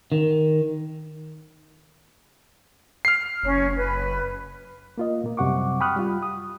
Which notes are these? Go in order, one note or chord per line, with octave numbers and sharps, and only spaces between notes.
D#3
F6 C7
F#1 C#4
B4
A#3 F4 D#5
A#2 A#3
F#2 C3 G3 F#5 C#6 D6
G5 B5 C#6 D#6 F6 F#6
G3 F4
D#6